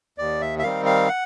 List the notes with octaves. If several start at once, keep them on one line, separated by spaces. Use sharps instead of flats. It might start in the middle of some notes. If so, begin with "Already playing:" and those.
D#2 D5
E5
E5
D#3 G3 C4 D#4 F5
F5
F#5